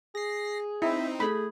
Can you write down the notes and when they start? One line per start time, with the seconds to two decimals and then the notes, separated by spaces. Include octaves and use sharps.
0.15 G#4 A#6 C7
0.82 C4 D#4 E4 E5
1.20 A3 G#4 B5